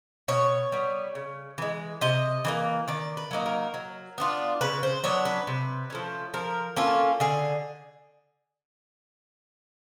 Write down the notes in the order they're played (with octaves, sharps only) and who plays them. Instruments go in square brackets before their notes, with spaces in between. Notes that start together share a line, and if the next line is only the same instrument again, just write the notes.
[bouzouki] B2 C#5
G3 B3
C#3
E3 G#3
C3 D#5
E3 G3 A#3
D#3 D5
B4
F#3 A#3 D#4
A#4
F#3
B3 D4 F4
C#3 B4
C5
F#3 B3 D4 C#5
B4
C3
F3 A3 C#4
F3 A#4
A#3 C#4 F4 A4
D3 G#4